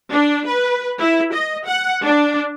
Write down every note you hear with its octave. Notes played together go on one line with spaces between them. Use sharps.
D4
B4
E4
D#5
F#5
D4